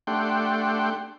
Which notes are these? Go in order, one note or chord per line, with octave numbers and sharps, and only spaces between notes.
A3 D4 G4 F#5 G5 C6